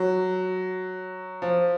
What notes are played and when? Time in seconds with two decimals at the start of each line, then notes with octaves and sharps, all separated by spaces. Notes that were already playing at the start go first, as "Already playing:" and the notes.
Already playing: F#3
1.42 F3